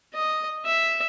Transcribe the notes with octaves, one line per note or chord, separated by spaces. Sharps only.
D#5
E5